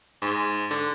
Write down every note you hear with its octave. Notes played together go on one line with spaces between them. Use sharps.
G#2
D3